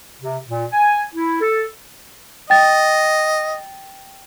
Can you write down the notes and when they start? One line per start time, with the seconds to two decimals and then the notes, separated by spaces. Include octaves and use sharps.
0.21 C3
0.48 A#2
0.72 G#5
1.14 E4
1.41 A4
2.50 D#5 G5 A6